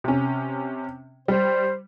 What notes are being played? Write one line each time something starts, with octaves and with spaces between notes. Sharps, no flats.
C3 C#4
G3 C5